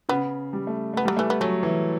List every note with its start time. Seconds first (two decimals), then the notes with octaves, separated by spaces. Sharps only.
0.09 C#3 B3
0.53 G3
0.67 A3
0.94 A3 B3
1.05 F#3 G3
1.17 E3 A3
1.30 B3
1.41 F#3 A3 C#4
1.63 E3